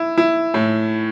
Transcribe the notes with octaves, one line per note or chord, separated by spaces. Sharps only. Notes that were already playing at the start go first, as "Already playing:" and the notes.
Already playing: E4
E4
A2